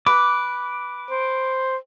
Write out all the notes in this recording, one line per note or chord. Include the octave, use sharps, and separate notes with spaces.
B4 D6
C5